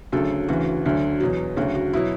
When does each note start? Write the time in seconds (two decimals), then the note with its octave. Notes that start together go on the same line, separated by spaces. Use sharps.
0.12 D2 C#3 F#3 A4
0.49 D2 C#3 E3 F#4
0.85 D2 D3 F#3
1.20 E2 B2 F#3
1.56 D2 C#3 F#3 F#4
1.75 F#4
1.93 B2 F#3 E4